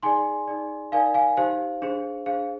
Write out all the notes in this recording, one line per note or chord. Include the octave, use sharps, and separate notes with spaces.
D#4 G#4 D5 G#5 C6
D#4 G#4 D5
D#4 A#4 D5 F5 G#5
F5 G#5
D#4 G4 C5 F5
D4 G#4 C5
D4 G#4 C5 F5